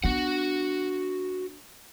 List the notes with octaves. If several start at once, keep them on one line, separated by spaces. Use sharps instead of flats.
B3 D4 F#4 F#5